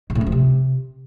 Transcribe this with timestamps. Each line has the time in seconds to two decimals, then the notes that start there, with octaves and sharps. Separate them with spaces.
0.10 G#2
0.15 A2
0.21 F#2
0.27 F3
0.32 C3